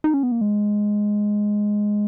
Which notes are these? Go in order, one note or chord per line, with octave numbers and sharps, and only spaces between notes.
D#4
C#4
B3
A#3
G#3